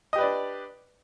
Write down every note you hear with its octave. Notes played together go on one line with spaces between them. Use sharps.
D4 G4 B4 D5 D#5